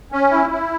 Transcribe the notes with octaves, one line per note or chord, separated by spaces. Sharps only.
C#4
E4
E4